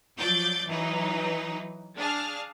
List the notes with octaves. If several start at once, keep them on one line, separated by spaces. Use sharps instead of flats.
F3 F#3 D5 G6 A6
E3 F#3 D#4 B4
D4 G#4 F5 A5 F6